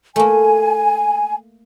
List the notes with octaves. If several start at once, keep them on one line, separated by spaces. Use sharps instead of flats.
A3 A#3 G#5